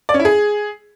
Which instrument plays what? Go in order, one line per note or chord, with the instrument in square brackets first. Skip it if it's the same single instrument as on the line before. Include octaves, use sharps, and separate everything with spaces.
[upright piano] D5
C#4
E4
G#4